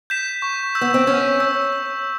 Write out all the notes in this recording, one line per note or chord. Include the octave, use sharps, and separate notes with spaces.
G6 B6 E7
C#6
E6 G6
B3
C4
C#4 C#6
E6 G6
G6